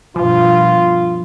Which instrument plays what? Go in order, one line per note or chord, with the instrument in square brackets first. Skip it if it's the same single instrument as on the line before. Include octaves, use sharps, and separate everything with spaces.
[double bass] G2 B2 [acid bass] F3 [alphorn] F4